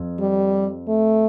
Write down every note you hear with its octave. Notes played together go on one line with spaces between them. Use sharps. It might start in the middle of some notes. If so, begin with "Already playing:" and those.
Already playing: F2
G3
A3